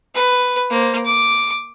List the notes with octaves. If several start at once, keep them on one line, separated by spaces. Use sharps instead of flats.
B4
A#3 C5
D6